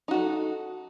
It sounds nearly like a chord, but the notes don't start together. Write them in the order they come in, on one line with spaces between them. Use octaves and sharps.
D#4 F#4 A4